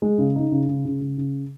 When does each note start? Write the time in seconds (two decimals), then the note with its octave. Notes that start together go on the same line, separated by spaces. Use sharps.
0.02 G#3
0.18 C#3
0.36 D#4
0.52 C#3
0.68 C#3
0.85 C#3
1.01 C#3
1.17 C#3